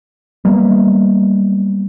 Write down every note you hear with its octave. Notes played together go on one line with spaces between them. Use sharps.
F#3 G3 A#3 B3